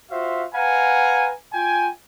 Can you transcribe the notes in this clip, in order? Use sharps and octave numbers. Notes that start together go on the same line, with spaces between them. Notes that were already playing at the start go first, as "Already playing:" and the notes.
F4 F#4 C5 E5 F5
B4 F5 F#5 G#5 A#5
F4 G5 G#5